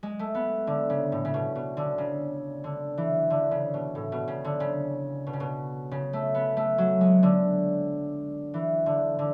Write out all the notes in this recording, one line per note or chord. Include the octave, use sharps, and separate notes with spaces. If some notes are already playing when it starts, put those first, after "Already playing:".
G#3
A3
B3
D3
C#3
A2
C#3
B2
B2
D3
C#3
D3
E3
D3
C#3
B2
A2
B2
C#3
D3
C#3
B2
C#3
B2
C#3
A3
B3
A3
F#3
G#3
D3
E3
D3
D3